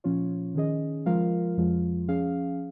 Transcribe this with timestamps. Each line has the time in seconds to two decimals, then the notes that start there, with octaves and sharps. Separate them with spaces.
0.04 A#2 F3 C#4 F4 C#5
0.55 D#3 C#4 G#4 D#5
1.06 F3 G#3 F4 A#4 F5
1.57 F2 F3 G#3 F4
2.08 F3 C#4 G#4 F5